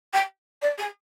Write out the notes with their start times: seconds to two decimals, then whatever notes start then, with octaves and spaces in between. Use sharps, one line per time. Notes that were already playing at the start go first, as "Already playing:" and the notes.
0.13 G5
0.61 D5
0.78 G#4